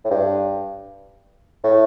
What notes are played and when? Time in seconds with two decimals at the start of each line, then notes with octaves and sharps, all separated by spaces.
0.05 A2
0.10 G2
1.64 A2